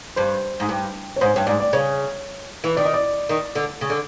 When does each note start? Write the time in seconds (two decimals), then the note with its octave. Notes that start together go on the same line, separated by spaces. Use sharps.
0.16 G2 C5
0.60 G#2
0.69 G2
1.16 C#5
1.21 G#2 C5
1.34 G2 C#5
1.47 G#2 D5
1.60 D5
1.73 C#3 C#5
2.64 E3
2.77 D#3 D5
2.85 D#5
2.94 D5
3.29 D#3
3.55 D3
3.81 C#3
3.90 D3